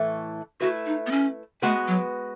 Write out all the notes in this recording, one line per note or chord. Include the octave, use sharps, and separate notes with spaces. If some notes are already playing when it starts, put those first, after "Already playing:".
Already playing: A2 E3 A3
A3 E4 F#4 B4
D#4
B3
C#4
G#3 A3 B3 F#4 B4
F#3